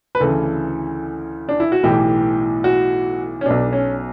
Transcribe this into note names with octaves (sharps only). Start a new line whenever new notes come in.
B4
D2 C#3 E3 A4
D4
E4
F#4
B1 A2 E3 G4
F#4
C#4
B1 B2 D4
C#4